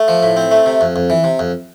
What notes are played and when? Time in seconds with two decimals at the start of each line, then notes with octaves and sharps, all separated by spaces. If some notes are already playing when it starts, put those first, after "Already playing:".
Already playing: A3
0.08 F3
0.23 A2
0.37 C4
0.51 A3
0.66 C3
0.81 F2
0.96 F2
1.10 E3
1.24 C3
1.39 F2